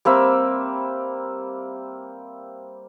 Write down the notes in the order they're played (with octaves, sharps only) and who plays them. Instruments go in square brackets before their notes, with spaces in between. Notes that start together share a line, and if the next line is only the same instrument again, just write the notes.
[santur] G3 A#3 C4 E5